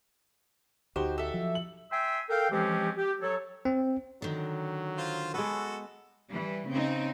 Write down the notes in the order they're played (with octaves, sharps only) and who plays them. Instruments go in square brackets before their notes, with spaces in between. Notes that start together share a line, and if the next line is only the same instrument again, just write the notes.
[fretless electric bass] D2 [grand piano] D#4 F#4 G4 [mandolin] C5
[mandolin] A4 E5
[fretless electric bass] F3 F#3
[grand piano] F#7
[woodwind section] E5 G5 G#5 C6 E6
A4 A#4 F5 G5
E3 F3 G#3 C4 C#4 G4
G4
F#3 A4 C#5
[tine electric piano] C4
[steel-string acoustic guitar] D3 D#3 [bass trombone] F#3
[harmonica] F4 C5
[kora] G#3 B3 [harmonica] F#4 A4
[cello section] E3 G3
C#3 C4 D#4